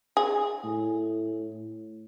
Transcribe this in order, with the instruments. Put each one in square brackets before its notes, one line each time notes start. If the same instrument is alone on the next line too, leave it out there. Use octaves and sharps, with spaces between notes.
[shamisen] G#4
[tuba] A2